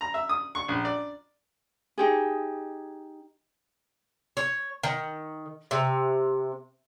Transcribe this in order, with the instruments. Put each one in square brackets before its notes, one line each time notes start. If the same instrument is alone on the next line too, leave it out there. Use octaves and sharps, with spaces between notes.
[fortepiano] A#5
E5
D#6
C#6
A#1
D5
[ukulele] D#4 G4 G#4
[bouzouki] C#5
D#3
C3